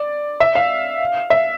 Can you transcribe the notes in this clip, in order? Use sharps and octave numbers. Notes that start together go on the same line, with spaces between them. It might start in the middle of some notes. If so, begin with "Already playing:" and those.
Already playing: D5
E5
F5
E5